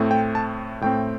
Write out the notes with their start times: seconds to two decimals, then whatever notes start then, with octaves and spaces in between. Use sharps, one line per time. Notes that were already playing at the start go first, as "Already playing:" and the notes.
Already playing: A2 A3 C4
0.11 G5
0.35 A5
0.81 A2 A3 C4 G5